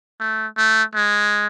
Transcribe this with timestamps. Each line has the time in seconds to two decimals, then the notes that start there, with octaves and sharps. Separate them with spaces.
0.20 A3
0.57 A3
0.95 G#3